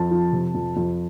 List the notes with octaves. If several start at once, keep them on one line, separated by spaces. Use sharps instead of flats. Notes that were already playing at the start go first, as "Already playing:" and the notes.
Already playing: F2 A5
F3
C3
F2
F2